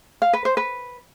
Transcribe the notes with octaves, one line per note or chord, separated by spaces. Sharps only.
F5
B4
C5
B4